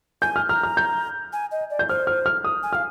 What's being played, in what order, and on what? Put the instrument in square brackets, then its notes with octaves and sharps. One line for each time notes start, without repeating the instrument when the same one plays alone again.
[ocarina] G#5 [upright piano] G6
[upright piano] F6
[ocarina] A#5 [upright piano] F6
[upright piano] F6
G6
[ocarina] G#5
D#5
D5
[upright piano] G6
[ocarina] C5 [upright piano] F6
[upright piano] F6
F6
D#6
[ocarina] G#5
[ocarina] F5 [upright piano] F6